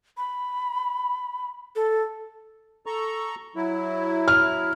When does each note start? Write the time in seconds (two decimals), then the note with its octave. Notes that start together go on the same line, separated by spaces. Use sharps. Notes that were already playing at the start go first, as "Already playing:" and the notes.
0.17 B5
1.76 A4
2.86 A4 A#5 C#6
3.56 F#3 E4
4.28 F6